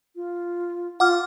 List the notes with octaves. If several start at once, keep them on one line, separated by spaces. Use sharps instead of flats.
F4
F4 F#5 D6 F6